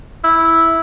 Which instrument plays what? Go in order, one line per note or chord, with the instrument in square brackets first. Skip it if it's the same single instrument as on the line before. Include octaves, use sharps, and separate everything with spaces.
[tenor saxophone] E4